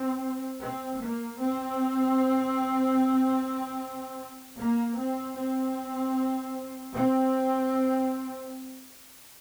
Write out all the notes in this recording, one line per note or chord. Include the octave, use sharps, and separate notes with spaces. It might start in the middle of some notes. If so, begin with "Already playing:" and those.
Already playing: C4
C4
A#3
C4
A#3
C4
C4
C4